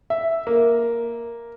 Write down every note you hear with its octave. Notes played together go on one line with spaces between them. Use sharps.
E5
A#3